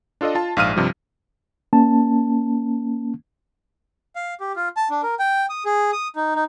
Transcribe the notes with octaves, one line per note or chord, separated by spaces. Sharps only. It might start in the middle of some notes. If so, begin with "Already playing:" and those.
D4 F4 A4 D5 D#5
F4 A5
A#1 G#2 F5 D#6 F6 D#7
G2 C3 F3 G3
A#3 C#4 A5
F5
G4
F4
A5
D4
A#4
G5
D#6
G#4
D#6
D#4
D#4